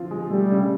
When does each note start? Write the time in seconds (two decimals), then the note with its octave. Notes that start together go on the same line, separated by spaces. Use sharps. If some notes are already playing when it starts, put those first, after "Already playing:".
Already playing: D3 F3 C4 F4
0.11 G#3
0.30 G3 A3
0.51 C#3